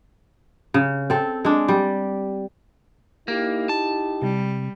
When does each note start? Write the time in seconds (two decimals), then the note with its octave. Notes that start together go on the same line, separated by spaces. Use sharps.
0.74 C#3
1.10 C4 A4
1.45 G#3 D4
1.68 G3
3.28 A#3 D#4 E4 G4
3.69 A5
4.22 C3 G3